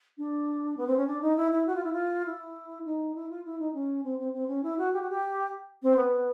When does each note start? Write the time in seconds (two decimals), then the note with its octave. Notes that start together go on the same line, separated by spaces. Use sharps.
0.18 D4
0.77 B3
0.87 C4
0.97 C#4
1.07 D4
1.22 D#4
1.37 E4
1.51 E4
1.67 F#4
1.75 F4
1.83 E4
1.92 F4
2.26 E4
2.85 D#4
3.15 E4
3.30 F4
3.45 E4
3.59 D#4
3.74 C#4
4.04 C4
4.19 C4
4.33 C4
4.48 C#4
4.63 E4
4.78 F#4
4.93 G4
5.01 F#4
5.10 G4
5.82 C4
5.97 B3